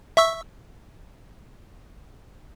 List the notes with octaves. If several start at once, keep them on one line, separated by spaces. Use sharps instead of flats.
E5 C#6 E6